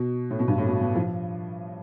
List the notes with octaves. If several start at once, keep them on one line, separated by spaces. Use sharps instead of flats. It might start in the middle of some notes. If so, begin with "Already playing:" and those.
Already playing: B2
A2
B2
G2
A2
B2
B2
F3